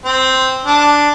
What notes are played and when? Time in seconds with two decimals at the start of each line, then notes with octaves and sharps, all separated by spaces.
0.05 C4
0.65 D4